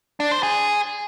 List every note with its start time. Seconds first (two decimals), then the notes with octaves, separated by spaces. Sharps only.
0.20 D4
0.31 C5
0.43 G#4